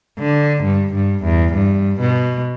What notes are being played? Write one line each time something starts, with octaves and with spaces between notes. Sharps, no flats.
D3
G2
G2
E2
G2
B2